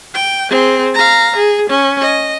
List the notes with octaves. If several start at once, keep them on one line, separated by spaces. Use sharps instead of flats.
G5
C4 G#4
F5 A#5
G#4
C#4
D#5